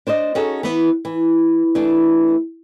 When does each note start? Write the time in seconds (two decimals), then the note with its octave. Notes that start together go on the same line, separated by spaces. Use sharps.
0.07 D4 C5 D5 D#5
0.35 C#4 D#4 F#4 G#4 A4
0.63 E3 B3
1.05 E3
1.75 E3 A3 D4